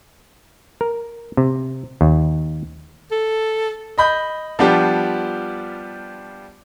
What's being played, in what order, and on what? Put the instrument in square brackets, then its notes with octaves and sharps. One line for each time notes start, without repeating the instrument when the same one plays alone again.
[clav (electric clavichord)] A#4
C3
D#2
[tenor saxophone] A4
[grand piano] D#5 B5 G6
F3 G3 B3 D4 F4 G4